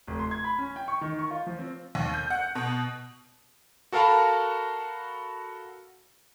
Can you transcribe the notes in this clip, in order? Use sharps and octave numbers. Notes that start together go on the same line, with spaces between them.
F1
C6
G#6
B5
C#4
G5
C#6
D#3
C#6
F4
F3
C4
D#2
G6
F#5
B2
F#4 A4 A#4 F5 A5 B5